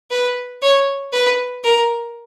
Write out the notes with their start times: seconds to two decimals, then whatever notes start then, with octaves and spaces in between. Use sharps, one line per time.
0.11 B4
0.62 C#5
1.12 B4
1.64 A#4